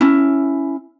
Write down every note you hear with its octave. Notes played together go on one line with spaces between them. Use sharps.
C#4 E4